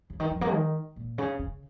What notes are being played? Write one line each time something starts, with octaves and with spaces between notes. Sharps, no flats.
C#3
D#3
F3
A#3
D#3
A#2
C#3
C#3